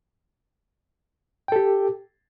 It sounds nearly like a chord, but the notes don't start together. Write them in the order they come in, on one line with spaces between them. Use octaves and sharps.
G5 A4 G4